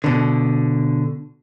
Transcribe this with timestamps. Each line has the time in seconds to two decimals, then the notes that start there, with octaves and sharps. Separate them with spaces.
0.04 B2 D3